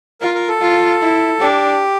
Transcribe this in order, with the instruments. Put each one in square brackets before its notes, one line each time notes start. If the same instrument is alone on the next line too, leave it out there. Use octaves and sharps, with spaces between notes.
[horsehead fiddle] F4 [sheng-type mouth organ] A#4
[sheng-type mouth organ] A#4
A4
[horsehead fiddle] F4
E4
[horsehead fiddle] D4 [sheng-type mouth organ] G4